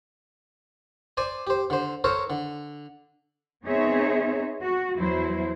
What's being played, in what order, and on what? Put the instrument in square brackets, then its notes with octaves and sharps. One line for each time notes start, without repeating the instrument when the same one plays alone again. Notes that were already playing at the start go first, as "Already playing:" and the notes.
[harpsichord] C5 D5 G#5
G4 C5
D3 C5
A4 A#4 C5 C#5
D3
[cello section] B3 C4 D#4 G#4 C#5 E5
F#4
E2 F#3 E4 C5